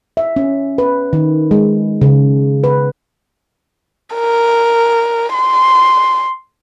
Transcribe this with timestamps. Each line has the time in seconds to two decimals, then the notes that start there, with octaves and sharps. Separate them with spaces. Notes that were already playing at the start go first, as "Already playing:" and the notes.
0.17 E5
0.36 C#4
0.78 B4
1.13 D#3
1.51 G#3
2.02 C#3
2.64 B4
4.15 A#4
5.34 C6